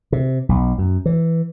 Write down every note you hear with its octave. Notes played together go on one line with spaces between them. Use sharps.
C3
B1
F#2
E3